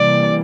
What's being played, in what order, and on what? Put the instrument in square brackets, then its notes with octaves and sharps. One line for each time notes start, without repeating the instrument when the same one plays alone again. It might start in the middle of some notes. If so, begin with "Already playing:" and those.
Already playing: [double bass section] C3 E3 G3 A#3 [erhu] D5